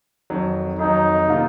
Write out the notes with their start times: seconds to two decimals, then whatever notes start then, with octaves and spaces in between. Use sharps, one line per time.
0.30 F2 D#3 F#3
0.79 F2 D#3 F#3 D#4
1.28 C3 D#3 A#3 F4